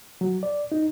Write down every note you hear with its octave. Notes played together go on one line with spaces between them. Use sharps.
F#3
D5
D#4